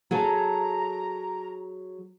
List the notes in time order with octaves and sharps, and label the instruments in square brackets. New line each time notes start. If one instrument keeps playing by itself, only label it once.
[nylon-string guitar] F#3 G#4 A4 [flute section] A#5